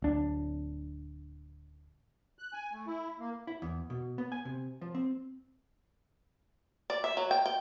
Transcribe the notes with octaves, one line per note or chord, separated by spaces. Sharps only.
D1 D4
F#6
G#5
A3
E4
A#3
E4
E2
B2
B3
G#5
C3
F3
C4
D5
E5
F#3
G5
G5